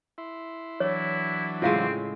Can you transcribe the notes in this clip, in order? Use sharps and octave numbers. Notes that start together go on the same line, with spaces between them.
E4 C6
E3 F#3 D4 E4 C#5
A2 C#3 G#3 C4 E4 F4 F5